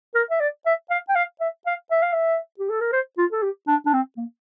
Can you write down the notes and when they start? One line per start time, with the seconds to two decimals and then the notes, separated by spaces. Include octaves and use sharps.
0.15 A#4
0.31 E5
0.40 D5
0.66 E5
0.90 F5
1.09 G5
1.16 F5
1.41 E5
1.66 F5
1.91 E5
2.03 F5
2.13 E5
2.59 G4
2.70 A4
2.81 A#4
2.92 C5
3.18 F4
3.32 A4
3.43 G4
3.68 D4
3.86 D4
3.93 C4
4.17 A#3